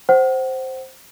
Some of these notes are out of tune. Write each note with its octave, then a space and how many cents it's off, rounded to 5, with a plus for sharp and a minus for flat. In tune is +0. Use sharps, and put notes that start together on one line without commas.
C5 +0 F#5 +30